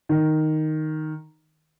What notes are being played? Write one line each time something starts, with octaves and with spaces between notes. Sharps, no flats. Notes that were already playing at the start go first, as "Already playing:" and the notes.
D#3